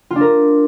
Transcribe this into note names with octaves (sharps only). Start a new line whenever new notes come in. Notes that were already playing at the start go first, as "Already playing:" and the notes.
F4
D4
A#4